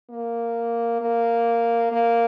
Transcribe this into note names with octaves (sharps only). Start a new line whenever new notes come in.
A#3
A#3
A#3